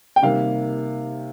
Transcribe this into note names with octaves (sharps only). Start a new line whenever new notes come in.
G5
C3 D#3 G3 A#3 F5